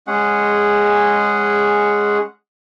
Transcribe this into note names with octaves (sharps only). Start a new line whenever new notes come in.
G#3 C#4 G#4 F#5